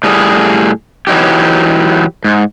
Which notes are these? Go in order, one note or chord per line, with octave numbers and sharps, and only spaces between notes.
A2 G3 G#4
E3 F#3 D#4 G4
G#2